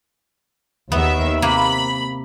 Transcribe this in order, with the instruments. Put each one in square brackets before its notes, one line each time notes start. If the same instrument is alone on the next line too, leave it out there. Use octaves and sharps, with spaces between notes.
[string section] D#2 D#3 E5 [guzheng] B3
[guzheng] C3 A#3 [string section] B5